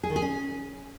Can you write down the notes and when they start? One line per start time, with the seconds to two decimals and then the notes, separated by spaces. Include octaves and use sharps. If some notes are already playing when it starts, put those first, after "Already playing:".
0.03 G#4
0.10 D#3
0.16 G#4
0.22 C#4